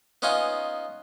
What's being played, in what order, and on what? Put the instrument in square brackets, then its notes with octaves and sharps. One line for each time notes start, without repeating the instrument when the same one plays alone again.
[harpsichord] B3 C#4 D#4 F4 G#5